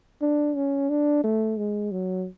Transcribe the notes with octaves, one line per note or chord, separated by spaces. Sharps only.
D4
C#4
D4
A3
G#3
F#3